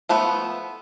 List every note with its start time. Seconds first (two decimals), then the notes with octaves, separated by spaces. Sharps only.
0.09 F3 A3 B3 B5